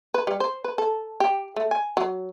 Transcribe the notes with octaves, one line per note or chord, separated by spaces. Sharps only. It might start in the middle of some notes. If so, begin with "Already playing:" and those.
B4
G3
C5
B4
A4
G4
A3
G#5
F#3